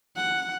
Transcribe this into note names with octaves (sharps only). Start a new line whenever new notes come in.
F#5